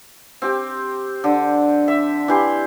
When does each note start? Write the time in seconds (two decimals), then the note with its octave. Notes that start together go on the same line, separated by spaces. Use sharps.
0.42 C4 G4
1.24 D3
1.88 E5
2.28 E3 G4 C6